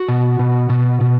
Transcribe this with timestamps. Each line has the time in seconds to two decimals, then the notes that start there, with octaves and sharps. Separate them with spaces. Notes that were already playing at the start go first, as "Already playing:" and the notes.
Already playing: F#4
0.09 B2
0.39 B2
0.70 B2
1.01 B2